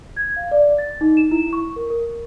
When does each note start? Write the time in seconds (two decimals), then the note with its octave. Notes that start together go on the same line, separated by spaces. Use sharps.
0.17 G#6
0.36 F5
0.52 D5
0.78 A6
1.01 D#4
1.17 E7
1.31 E4
1.53 C#6
1.76 A#4
1.90 A#4